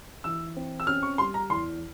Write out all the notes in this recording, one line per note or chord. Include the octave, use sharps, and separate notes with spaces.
E3 E6
C4
E6
C#4 F6
C#6
G3 C6
A#5
E2 C6